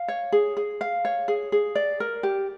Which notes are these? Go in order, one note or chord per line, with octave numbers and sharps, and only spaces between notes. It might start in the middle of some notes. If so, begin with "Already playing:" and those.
Already playing: F5
C#5
G#4
G#4
F5
C#5
G#4
G#4
D5
A#4
G4